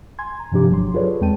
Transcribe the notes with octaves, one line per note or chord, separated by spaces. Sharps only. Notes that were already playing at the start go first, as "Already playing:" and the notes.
G#5 C6 G#6
A#5
G2 C3 F3 D4 G4 D6
G1 F#3 C6
F4 G#4 A4 B4 C#5 D5
E2 G#3 C4 G5 A5 D#7